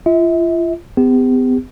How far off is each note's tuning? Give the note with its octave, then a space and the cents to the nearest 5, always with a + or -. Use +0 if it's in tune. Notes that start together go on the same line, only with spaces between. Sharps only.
F4 -35 E5 -35
B3 +40 G4 +35